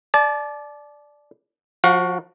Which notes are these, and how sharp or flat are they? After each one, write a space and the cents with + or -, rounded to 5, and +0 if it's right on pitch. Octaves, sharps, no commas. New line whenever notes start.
D5 +0 A5 -35
F3 +30 F#4 +0 F5 +35